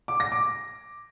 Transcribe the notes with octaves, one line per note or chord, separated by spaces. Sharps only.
D6
A#6
D6